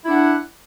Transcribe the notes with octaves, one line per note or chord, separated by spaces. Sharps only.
D4 E4 F#5